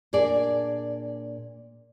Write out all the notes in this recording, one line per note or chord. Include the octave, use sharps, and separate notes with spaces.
A#2 D4 G#4 D5